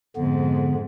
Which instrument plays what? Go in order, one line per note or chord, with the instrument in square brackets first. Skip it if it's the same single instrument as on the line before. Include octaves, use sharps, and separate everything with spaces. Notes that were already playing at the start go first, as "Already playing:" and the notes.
[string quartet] F2 G#2 [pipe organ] D3 B3